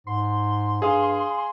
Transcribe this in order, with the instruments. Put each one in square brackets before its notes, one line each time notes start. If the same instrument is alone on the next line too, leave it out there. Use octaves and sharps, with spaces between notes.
[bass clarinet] G#2 [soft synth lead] C6
[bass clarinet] G2 [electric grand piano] G#4 F5 D#6